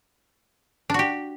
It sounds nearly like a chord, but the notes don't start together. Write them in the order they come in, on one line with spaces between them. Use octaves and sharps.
D4 F#4 G4